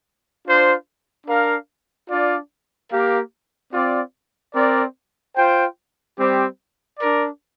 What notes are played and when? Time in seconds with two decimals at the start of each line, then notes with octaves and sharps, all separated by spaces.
0.46 D4 F4 C5
1.27 D4 A#4 F5
2.10 D4 F4 D5
2.91 A#3 G4 A#4 F5
3.73 C4 F4 D5
4.55 C4 A#4 D5
5.36 F4 C5 G5
6.17 G3 C4 G4 C5
6.99 D4 A#4 D5